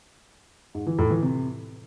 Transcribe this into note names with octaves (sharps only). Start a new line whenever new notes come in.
G#2
E3
A2
E3
C3